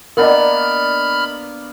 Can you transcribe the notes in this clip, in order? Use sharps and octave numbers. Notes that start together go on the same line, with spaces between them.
A#3 B3 D4 A#4 D#5 B5 F6